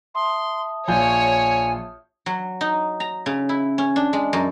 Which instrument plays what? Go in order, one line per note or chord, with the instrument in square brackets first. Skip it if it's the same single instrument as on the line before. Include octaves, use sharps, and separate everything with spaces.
[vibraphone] E5 A5 D#6 [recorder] C6
[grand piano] A#1 F4 G6 [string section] C#5 [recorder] G#5
[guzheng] F#3
D#4
A#5
C#3
E4
C#4
D4
G#3
F#2